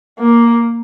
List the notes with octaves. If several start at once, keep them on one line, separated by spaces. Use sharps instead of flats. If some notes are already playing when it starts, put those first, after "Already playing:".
A#3